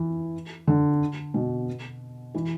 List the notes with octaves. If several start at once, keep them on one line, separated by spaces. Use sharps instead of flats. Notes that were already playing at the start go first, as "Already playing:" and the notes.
Already playing: E3
D3
B2
E3